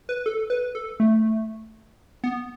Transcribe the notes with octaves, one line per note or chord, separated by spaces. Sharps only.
B4
A4
B4
A4
A3
B3